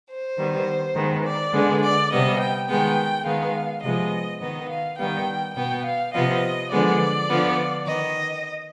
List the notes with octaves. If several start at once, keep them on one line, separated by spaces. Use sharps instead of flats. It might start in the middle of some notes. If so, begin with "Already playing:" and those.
C5
D#3 G3 B3
D#3 G#3 B3
D5
D3 G#3 B3
D5
C3 G3 B3 D#5
G5
D#3 G#3 B3 G5
D#3 G#3 B3 F5
C3 F3 G#3 B3 D#5
D#3 B3 D#5
F5
D#3 G3 B3 G5
B2 B3 G5
F5
C3 F3 B3 D#5
D3 F3 G#3 B3 D5
D3 F3 B3
D#3 B3 D#5